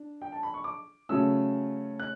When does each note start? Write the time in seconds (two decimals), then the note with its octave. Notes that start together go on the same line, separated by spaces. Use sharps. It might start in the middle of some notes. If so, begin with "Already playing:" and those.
Already playing: D4
0.22 G5
0.32 A5
0.43 B5
0.54 C#6
0.64 D6
1.09 C#3 F#3 A3 C#4 E6
2.00 F#6